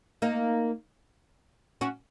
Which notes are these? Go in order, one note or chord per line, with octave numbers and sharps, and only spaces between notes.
A#3 D#4
C#4 F#4